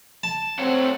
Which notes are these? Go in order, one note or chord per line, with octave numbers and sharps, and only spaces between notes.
A5
A3 C4 C#5 F#5